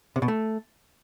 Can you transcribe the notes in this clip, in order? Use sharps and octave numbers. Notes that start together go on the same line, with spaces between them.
C3
B2
A3